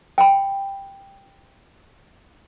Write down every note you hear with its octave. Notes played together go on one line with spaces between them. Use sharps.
G5 B5